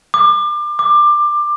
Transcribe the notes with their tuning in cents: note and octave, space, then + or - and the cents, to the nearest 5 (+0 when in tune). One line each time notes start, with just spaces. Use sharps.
D6 +30
D6 +20